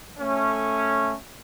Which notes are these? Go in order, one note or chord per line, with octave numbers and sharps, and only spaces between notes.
A3 C#4